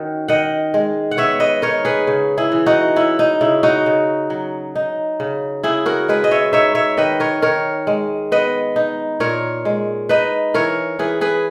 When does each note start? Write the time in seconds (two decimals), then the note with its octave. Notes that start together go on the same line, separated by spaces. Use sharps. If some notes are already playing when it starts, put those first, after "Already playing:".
Already playing: D#3 C#4 F#4
0.28 D#3 D#5 F#5
0.74 G#3
1.11 F#5
1.17 B3 C#5 E5
1.40 B4 D#5
1.62 D#4 A#4 C#5
1.85 G#4 B4
2.07 C#3
2.38 E4 G#4
2.52 E3
2.66 D#4 F#4
2.96 C#4 E4
3.19 D#4
3.41 C#3 E4
3.63 D#4 F#4
3.86 C#3
4.30 F#3
4.75 D#4
5.20 C#3
5.63 C#3 E4 G#4
5.86 F#4 A#4
6.09 G#3 G#4 B4
6.24 D#5
6.31 C#5 E5
6.53 D#4 C#5 E5
6.75 C#5 E5
6.97 D#3 B4 D#5
7.20 A#4 C#5
7.42 D#3 A#4 C#5
7.87 G#3
8.32 B3 B4 D#5
8.76 D#4
9.20 A#2 A#4 C#5
9.65 G#3
10.09 D#4 B4 D#5
10.54 E3 A#4 C#5
10.99 E3 G#4 B4
11.21 G#4 B4